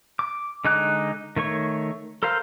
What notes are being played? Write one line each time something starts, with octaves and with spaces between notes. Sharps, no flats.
D6
D3 G#3 D#4 D6 F#6
D#3 A3 C#5 C#6
A4 A#4 C5 F5